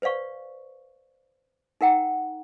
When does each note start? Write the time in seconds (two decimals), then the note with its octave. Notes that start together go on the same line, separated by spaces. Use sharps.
0.02 B4 C5 D5 F5 C#6
1.81 D#4 A#4 F#5 G5 A#5